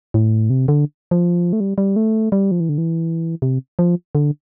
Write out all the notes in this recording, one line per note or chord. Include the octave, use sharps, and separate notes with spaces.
A2
C3
D3
F3
A3
G3
G3
A3
G3
F3
E3
D3
E3
C3
F3
D3